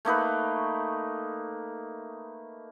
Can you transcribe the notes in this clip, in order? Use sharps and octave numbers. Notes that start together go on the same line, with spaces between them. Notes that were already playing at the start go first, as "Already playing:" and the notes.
A3 A#3 D#4 B4